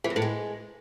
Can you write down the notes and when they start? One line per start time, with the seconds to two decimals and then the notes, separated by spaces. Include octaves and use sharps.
0.04 E3
0.10 E2
0.16 A2
0.22 G#3